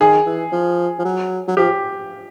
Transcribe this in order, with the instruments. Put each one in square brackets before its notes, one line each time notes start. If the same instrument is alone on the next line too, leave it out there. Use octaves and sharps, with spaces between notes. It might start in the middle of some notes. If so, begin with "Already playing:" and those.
[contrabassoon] D#3 [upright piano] G#4
[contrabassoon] E3
F3
F3
F#3
F#3
[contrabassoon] F3 [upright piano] G4